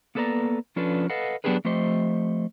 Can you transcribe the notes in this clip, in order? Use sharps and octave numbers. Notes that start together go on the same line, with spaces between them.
A#3 B3 A4 B4 D5 A#5
F3 C#4 D4 F4 A4 B4
A4 B4 D#5 F5 F#5
F#3 B3 D4 G4 G#4 B4
F3 A3 C4 G4 C5 D#5